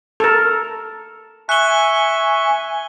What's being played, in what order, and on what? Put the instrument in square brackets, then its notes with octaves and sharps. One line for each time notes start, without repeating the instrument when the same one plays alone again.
[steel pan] A4 A#4
[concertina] E5 C#6 [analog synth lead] G#5 [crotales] F#6 G7